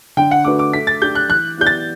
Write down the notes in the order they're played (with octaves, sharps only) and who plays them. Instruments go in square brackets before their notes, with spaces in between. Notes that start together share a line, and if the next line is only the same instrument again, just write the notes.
[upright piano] D3 [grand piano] G5
[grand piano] F#5
[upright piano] A3 D4 F#4 B4 [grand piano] D6
[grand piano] D6
[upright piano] A3 [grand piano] B6
[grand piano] A6
[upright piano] D4 G4 [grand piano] G6
[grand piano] F#6
[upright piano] E3 [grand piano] F#6
[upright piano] B3 E4 G4 D5 [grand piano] G6
[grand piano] A6